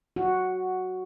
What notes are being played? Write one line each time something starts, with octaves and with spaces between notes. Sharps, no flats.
F#4